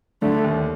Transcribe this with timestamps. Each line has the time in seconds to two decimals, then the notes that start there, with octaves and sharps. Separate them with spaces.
0.22 D3 A3
0.44 D#2